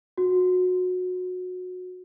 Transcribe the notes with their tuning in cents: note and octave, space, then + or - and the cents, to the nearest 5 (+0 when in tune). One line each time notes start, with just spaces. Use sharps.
F#4 -20